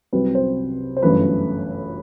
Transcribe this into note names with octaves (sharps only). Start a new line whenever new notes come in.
C2 C3 F#3 B4
C5
C5
G1 F#2 E3 A3 B4